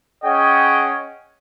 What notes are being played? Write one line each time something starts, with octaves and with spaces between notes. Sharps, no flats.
C#4 G#4 C#5 D#5 F#5 G5